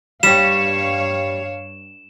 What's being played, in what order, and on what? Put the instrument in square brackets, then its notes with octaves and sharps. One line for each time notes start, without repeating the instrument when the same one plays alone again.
[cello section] G2 C#5 F5 [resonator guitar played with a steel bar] G3 G4 [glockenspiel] E7